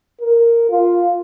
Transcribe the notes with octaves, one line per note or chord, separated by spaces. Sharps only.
A#4
F4